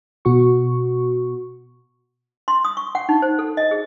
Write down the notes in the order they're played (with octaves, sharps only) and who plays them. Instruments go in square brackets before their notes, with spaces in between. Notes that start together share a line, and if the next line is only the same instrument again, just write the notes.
[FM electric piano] B2 F#4 C#6
[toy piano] C6
D#6
C#6
F#5
D#4
C5
A4
D#5
G#4